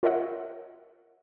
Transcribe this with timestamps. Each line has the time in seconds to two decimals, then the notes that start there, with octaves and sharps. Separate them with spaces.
0.03 F4 A#4 C#5 D#5 E5 F#5